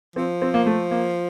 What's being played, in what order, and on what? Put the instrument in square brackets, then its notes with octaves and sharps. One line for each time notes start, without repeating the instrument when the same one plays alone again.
[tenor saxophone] F3 [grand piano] C4
[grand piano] C4
A#3
A3
A#3